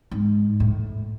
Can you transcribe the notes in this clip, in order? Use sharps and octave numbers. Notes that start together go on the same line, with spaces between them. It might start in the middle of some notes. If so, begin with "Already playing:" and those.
G#2
A2